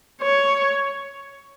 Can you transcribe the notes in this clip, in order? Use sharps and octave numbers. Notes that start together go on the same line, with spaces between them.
C#5